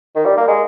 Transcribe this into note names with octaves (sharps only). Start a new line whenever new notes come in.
D#3
G3
A#3
G#3